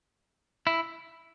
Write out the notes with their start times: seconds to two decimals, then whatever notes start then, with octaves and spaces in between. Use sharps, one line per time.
0.67 E4